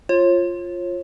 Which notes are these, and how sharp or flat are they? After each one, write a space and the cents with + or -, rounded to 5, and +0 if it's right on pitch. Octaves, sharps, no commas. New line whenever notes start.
F4 +0 C#5 -35